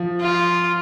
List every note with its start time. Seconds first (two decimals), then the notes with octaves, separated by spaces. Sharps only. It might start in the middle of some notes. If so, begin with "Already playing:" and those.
Already playing: F3
0.21 F4